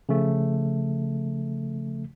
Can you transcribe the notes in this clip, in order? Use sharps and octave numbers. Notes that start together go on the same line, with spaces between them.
C#3 F3 A3